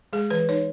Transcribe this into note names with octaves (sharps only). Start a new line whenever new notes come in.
G#3 G#4
E3 B4
D#4 C#5